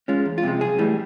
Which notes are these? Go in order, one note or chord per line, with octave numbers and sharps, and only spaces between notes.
G#3 C#4 F4
E2
F4
C3 F3 G#3
B1 G#4
A2 E3 G3